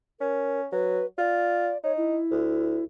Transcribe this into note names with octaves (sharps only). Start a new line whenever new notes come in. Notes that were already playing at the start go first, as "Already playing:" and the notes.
C#4 A#4
F#3 B4
F4 D5
D#4 C#5
E4
D2